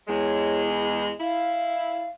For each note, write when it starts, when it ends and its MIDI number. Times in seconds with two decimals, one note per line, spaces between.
0.08 1.12 40
0.08 1.12 56
0.08 0.62 73
0.70 1.05 64
1.20 2.07 64
1.20 2.09 77